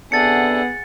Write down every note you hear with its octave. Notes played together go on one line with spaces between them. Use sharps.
C3 B3 D4 G#4 A4 F#5 A6 C#7